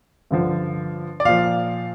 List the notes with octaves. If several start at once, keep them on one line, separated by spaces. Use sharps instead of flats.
G2 D3 F3
D5
A#2 F3 F5